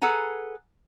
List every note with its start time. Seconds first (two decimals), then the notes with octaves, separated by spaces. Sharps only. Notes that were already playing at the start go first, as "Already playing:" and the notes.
0.02 G#4 A4 B4 F#5 G#5 A#5